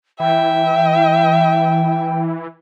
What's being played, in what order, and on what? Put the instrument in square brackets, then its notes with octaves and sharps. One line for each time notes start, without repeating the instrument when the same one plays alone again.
[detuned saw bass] E3 [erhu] E5 [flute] G5